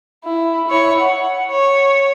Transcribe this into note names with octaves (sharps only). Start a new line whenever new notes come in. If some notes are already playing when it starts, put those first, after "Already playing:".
E4
E4 C#5
F#5
C#5